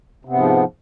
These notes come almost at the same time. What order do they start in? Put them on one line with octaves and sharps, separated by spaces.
C3 B3 G#2 F3